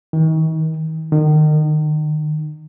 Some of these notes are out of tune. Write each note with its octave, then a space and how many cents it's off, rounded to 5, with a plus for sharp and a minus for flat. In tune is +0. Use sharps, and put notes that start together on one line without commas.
D#3 +40
D#3 -30